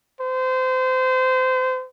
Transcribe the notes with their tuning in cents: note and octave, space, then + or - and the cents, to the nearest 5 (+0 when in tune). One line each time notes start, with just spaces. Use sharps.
C5 -25